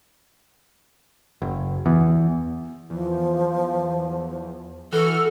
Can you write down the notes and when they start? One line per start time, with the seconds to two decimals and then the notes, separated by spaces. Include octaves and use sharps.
1.42 F#1
1.86 E2
2.90 E2 F3
4.92 E3 F#4 A4 F6